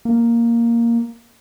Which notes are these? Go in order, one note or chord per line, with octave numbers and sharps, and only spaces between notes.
A#3